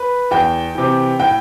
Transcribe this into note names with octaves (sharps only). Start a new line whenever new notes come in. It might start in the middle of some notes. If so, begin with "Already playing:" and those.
Already playing: B4
E2 G5
C3 E3
A2 G5